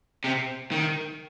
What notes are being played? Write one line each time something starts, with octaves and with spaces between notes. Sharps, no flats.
C3
D#3